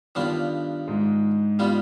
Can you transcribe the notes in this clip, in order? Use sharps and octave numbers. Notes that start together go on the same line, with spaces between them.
G2 D#3 G3 B3 D4 F4
G#2 G#3
G3 B3 F4